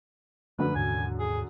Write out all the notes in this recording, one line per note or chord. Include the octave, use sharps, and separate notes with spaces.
F#2 D3 F3 A3 B4
D#2 G#2 C3 G#5
G#4